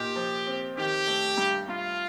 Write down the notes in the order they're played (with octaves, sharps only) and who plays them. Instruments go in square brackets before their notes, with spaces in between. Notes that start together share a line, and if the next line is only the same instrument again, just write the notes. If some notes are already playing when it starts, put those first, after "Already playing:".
Already playing: [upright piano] A#2 D#4 [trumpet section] G4
[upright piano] F3
C4
[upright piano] D#3 [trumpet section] G4
[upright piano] A3
G2
[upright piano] G2 [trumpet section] F4